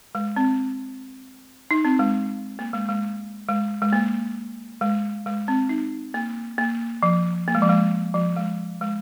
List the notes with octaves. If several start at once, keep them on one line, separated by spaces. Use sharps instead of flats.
G#3
C4
D#4
C4
G#3
A#3
G#3
G#3
G#3
G#3
A#3
G#3
G#3
C4
D#4
A#3
A#3
F3
A#3
G#3
F3
G#3
F3
G#3
G#3